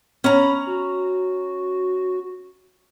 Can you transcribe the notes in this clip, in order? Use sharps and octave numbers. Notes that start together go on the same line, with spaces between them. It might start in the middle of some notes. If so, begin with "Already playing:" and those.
C#4 A#5 B5
F#4